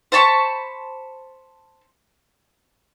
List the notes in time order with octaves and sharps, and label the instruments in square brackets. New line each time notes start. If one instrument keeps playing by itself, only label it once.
[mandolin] C5 A5 B5 C#6